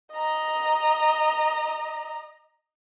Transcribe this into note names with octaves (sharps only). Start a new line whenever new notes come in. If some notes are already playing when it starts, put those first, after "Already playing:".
D#5 A#5